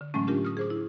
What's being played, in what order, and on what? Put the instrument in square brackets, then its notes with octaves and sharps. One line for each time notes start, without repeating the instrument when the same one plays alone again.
[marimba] D3
A2 E3 F#3 G#3 A3 C#4
C#4 D4 F4 G4 A#4
D#6 F6
G#4 C5 D6
E4